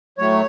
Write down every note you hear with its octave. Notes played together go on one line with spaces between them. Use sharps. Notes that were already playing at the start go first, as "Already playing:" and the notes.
A2 F#3 A3 C#5